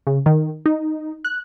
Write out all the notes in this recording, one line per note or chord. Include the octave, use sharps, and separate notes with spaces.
C#3
D#3
D#4
F#6